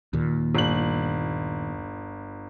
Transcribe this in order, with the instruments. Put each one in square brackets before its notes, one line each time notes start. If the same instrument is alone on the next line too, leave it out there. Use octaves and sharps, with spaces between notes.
[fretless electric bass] D#2 A#2
[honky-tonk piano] G1 F#7